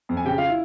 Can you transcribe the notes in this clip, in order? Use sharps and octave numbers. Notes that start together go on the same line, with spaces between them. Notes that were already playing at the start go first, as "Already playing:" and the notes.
F2
G#5
C#3 G4 G5
F4 F5
E4